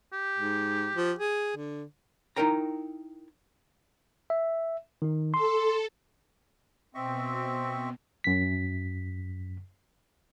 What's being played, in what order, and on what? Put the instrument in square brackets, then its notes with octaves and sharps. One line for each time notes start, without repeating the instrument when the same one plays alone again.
[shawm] G4
[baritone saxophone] G#2
F3
G#4
D3
[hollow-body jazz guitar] D#4 E4 A#4 G5 A#5
[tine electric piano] E5
D#3 D#4
[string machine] A4 [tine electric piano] C6
[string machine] B2 [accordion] C4 [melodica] D#5 E5 C#6
[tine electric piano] F#2 B6